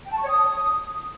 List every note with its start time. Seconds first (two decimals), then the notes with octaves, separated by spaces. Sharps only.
0.05 G5
0.11 A5
0.17 C#6
0.23 C#5
0.29 D#6